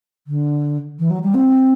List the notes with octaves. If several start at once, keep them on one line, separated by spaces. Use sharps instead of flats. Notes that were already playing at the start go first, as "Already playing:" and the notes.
D3
E3
F#3
G3
C4